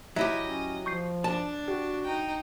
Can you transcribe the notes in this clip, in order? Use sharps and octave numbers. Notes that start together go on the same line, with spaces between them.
F#3 E4 G4 D#5 E5
C#4
F3 C#6 G6 C7
D4 A5
F#4 G4
D#4 G5